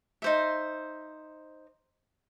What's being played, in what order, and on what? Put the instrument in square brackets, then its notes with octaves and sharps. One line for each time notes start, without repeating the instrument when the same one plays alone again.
[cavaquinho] D#4 C5 E5